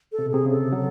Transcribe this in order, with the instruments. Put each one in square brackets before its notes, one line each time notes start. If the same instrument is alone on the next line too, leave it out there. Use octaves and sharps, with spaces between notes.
[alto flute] A4
[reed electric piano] C3
B2
[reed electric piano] C3 [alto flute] G#4
[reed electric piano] C#3
[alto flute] A4
[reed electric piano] F#3